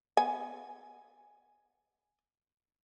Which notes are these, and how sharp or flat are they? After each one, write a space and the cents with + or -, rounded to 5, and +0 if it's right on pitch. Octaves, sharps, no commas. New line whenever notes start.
B3 +15 G#5 +0